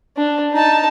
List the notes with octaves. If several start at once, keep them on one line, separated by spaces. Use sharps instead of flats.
D4
D#4 A5